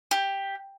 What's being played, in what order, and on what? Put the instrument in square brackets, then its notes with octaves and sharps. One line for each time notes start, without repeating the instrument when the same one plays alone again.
[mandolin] G4